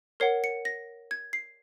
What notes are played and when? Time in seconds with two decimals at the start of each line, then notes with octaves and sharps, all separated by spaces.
0.20 A#4 C#5 F#5 C7
0.44 C#7
0.65 A#6
1.11 G#6
1.33 C7